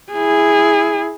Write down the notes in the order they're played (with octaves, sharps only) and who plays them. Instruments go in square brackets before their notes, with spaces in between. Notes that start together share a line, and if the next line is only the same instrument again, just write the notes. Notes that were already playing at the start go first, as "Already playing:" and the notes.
[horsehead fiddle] E4 G#4